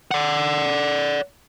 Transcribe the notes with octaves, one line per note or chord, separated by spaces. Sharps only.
D5 F#5